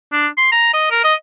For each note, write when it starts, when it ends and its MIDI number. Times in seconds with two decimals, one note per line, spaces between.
0.12 0.28 62
0.38 0.48 84
0.52 0.73 82
0.73 0.90 75
0.91 0.99 70
1.04 1.14 75